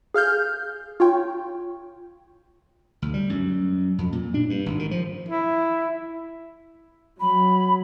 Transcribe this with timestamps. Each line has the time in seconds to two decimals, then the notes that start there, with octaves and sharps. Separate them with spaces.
0.14 G#4 F5 F6 G6
1.00 F4 C#5 G5
3.02 D2
3.14 G3
3.29 F#2
3.98 F2
4.12 A#2
4.34 D4
4.50 G2
4.66 G#1
4.79 D#3
4.91 F3
5.28 E4
7.20 F#3 B5